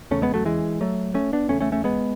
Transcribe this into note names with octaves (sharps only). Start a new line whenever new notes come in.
E2 C#3 A3 C#4
G#3 B3
F#3 A3
E3 G#3
F#3 A3
A3 C#4
B3 D4
E2 C#3 A3 C#4
A3 C#4
A3 C#4
G#3 B3